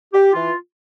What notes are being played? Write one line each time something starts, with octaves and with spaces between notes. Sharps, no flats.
G4
E3 F4